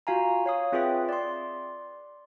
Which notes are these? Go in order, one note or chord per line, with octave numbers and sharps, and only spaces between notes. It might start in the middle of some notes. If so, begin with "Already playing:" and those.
F4 F#4 F5 G#5 A#5
C#5 F5 D#6
C4 F4 G#4 B4 E5 G5
D5 C6